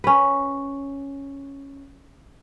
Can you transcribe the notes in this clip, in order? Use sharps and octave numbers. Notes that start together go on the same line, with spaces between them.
C#4 B4